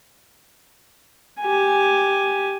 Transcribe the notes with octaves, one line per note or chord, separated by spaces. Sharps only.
G4 G#5